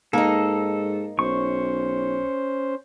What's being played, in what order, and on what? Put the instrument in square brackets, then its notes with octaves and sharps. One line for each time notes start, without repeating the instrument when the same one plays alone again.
[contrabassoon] G#2 [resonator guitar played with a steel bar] A#3 D#4 [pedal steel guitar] A4
[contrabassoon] B1 [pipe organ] C#4 C5 [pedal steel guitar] C#6